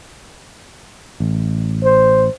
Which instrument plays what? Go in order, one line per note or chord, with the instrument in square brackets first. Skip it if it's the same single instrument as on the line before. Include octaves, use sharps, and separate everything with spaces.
[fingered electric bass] A1
[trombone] C5